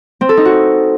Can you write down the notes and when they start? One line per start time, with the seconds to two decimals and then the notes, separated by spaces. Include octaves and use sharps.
0.21 C4
0.29 A4
0.37 D#4
0.45 F#4